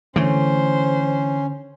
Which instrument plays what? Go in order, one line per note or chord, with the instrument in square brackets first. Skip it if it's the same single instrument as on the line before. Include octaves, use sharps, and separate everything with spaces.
[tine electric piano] D3 [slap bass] E3 A3 [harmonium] C#4 [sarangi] C5